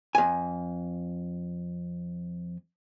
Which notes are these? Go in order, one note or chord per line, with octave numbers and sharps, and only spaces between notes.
F2 G#5